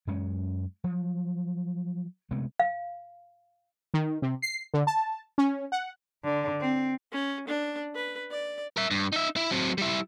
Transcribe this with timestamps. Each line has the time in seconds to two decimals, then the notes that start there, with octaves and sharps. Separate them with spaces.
0.07 F#2 G#3 C#4
0.84 F3 F#3
2.31 C3 G#3 A3 B3
2.59 F5
3.94 D#3
4.22 C3
4.42 C7
4.74 D3
4.87 A5
5.38 C#4
5.72 F#5
6.24 D3
6.60 C4
7.12 C#4
7.48 D4
7.95 B4
8.31 D5
8.77 A#4 E5
8.91 G2
9.13 D#4 E5
9.36 E4
9.51 F#3 C4
9.78 G3 E4